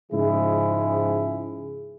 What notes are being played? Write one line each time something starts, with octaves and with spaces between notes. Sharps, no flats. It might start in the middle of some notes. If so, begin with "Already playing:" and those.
G#2 C#3 F3 G#3 E4 G#4